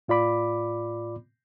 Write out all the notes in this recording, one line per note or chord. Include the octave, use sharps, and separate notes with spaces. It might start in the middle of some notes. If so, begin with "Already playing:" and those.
A2 F4 D5 B5 D6